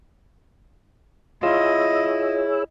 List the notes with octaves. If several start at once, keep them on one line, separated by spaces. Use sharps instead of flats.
E4 F4 G#4 C#5 D#5 E6